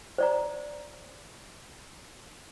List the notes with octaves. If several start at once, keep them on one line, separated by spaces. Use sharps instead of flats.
C5 D5 A#5